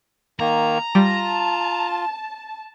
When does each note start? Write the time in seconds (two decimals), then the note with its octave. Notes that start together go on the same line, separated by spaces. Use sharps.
0.40 D#3 A#3 A#5
0.95 G3 F4 A5